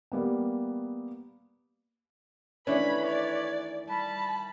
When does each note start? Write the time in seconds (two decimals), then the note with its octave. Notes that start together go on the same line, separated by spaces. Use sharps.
0.12 G3 A#3 B3
2.67 D#3 E3 A3 C#4 D4 B4 C#5 B5
3.05 D5
3.89 G3 A5 B5